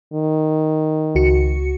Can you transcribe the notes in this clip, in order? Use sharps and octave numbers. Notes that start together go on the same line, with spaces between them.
D#3
C#2 F#4 C#7